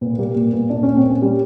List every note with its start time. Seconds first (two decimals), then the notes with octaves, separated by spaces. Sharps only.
0.01 A#2 B3
0.14 B3
0.18 G3 A#3
0.35 A#2 A#3
0.52 A#2 B3
0.70 A#2 D4
0.83 A#2 C#4
0.97 C4
1.05 A#2
1.10 C#4
1.22 G3